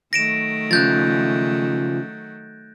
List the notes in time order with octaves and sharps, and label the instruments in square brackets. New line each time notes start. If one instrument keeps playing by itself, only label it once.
[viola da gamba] D#3 F#3 A3 [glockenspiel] A#6 D7 E7
[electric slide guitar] C#3 F3 [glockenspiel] F#6 G6 A6